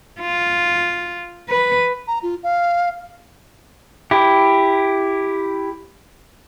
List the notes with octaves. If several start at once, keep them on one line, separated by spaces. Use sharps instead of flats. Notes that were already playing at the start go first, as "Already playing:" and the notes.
F4
B4
A#5
F4
F5
E4 G4